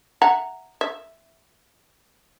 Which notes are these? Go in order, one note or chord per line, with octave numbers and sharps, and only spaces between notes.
E5 F#5 A#5
E5